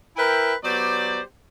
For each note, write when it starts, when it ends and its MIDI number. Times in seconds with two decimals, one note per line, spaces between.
0.16 0.54 64
0.16 0.54 70
0.16 0.54 71
0.16 0.54 76
0.16 0.54 79
0.64 1.20 54
0.64 1.20 59
0.64 1.20 67
0.64 1.20 72
0.64 1.20 74